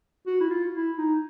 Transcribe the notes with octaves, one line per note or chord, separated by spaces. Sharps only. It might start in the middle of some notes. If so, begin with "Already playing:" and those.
F#4
E4
F4
E4
D#4